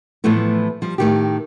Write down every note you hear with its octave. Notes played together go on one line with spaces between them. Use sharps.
A2 E3 F3 A3 B3 E4
F3 G3
A2 D#3 G4